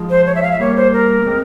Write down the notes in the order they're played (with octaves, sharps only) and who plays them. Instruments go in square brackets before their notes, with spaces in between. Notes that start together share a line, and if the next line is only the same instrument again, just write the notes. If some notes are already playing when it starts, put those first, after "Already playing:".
Already playing: [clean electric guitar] F3 G#3
[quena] C5
C#5
E5
F5
E5
[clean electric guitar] G3 A#3 [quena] C#5
[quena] C5
A#4
[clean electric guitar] A#3
G#3 C4